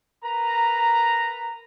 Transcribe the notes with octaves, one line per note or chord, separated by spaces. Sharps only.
A#4 B4 A#5